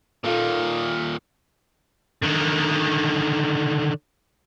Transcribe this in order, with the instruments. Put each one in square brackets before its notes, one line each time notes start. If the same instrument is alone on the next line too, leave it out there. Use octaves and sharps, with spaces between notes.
[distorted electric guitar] A#2 D#3 [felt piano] F4 A4
[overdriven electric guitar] D3 D#3